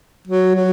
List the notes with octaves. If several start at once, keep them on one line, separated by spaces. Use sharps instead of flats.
F#3
F#3